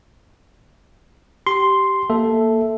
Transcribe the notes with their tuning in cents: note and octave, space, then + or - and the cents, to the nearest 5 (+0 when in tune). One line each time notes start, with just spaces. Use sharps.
G4 -15 C6 +0
A#3 -15 A4 +0 E5 +0